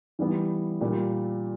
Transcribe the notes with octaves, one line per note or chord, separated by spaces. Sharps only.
E3 G3 B3
A#2 G3 A#3